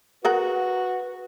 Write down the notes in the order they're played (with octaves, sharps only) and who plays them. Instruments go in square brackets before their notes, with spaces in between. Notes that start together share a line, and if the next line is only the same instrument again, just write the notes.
[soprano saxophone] F#4 [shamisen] G#4 A#4 F#5 [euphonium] B4